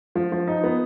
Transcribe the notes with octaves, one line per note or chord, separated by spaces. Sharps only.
F3
F3
D#4
B3